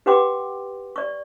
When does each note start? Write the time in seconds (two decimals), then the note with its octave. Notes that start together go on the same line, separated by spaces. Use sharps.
0.06 G4 B4 F#5 G5 C6 D6
0.96 D5 C#6